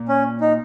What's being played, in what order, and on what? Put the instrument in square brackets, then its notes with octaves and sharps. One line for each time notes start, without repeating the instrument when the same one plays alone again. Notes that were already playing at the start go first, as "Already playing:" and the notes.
Already playing: [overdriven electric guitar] A#2
[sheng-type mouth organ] C#4
D#4